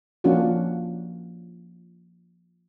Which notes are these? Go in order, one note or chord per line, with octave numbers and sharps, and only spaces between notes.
F3 A#3 C#4 D4 F4 F#4